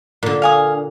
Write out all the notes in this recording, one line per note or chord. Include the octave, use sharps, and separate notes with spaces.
A#2 D3
F5 G#5 D#6